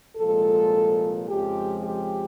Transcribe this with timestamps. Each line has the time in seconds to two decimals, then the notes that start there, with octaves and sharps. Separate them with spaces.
0.17 C2 A#2 F3 G#3 A4
1.28 F2 C#3 F3 G#3 G4
1.84 G4